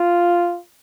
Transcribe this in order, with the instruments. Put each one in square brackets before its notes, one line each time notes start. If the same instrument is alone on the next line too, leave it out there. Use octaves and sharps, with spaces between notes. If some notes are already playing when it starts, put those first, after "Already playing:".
Already playing: [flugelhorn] F4